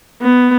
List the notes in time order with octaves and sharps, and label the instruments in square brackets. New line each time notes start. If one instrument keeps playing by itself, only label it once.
[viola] B3